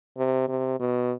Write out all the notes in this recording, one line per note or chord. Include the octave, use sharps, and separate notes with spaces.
C3
C3
B2